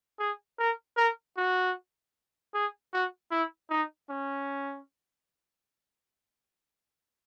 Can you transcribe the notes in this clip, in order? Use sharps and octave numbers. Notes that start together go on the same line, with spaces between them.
G#4
A#4
A#4
F#4
G#4
F#4
E4
D#4
C#4